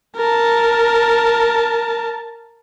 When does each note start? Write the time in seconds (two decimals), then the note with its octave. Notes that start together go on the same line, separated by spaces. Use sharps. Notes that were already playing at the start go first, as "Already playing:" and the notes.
0.16 A#4 A5